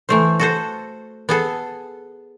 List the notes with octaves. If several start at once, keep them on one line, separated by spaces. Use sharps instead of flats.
E3 A3 C5
F#4 A4 C5
B3 G#4 A4